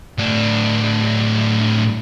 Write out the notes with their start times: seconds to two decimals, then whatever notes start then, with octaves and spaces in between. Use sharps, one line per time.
0.18 A2 D4